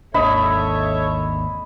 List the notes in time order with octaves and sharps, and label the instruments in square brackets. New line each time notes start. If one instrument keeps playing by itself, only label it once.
[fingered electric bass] G#1 D#2 D3 [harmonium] A4 C#5 E5 [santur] D#5 B5